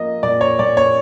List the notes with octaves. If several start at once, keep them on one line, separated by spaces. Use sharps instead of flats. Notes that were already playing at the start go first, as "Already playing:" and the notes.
Already playing: F3 A#3 D#5
A#2 D5
C#5
A#2 D5
C#5